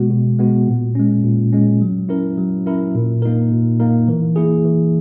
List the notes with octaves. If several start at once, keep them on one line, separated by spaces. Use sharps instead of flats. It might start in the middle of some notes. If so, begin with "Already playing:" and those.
Already playing: B2 G#3 B3 F#4
B2
G#3 B3 F#4
A#2
G#3 C#4
A#2
G#3 C#4
F#3
C#4 E4 A#4
F#3
C#4 E4 A#4
A#2
A#3 D#4 A#4
A#2
A#3 D#4 A#4
E3
A#3 E4 G#4
E3